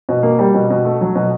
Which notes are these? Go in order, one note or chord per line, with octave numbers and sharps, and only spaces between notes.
B2
A#3
G3
B2
B2
A3
F#3
B2